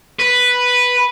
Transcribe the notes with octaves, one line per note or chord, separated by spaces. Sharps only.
B4